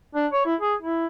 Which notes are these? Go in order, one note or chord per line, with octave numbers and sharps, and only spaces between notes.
D4
C#5
E4
G#4
E4